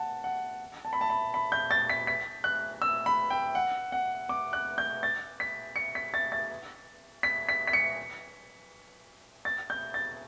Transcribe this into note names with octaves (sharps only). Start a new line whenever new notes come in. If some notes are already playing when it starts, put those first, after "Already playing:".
Already playing: F#5 A5
F#5
A5
B5
A5
B5
B5
G6
A6
B6
B6
F#6
E6
B5
G5
F#5
F#5
D6
F#6
G6
A6
B6
C#7
B6
A6
A6
B6
B6
B6
C#7
A6
G6
A6